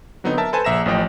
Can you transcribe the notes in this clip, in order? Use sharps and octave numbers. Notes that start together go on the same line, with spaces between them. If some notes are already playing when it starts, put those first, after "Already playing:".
D3 F#3 B3 C4 D#4
A#4 E5 A5
A4 B4 C5 G#5 A5
A#1 E5 A#5 A#6 E7
A1 A2 F3 D#5 G5